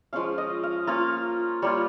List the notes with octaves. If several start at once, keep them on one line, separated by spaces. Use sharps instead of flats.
F3 G#3 C#4 F5
D#5
F5
A#3 C#4 F4 F5
G3 A#3 F4 C#5